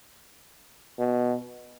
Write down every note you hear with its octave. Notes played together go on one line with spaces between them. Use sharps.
B2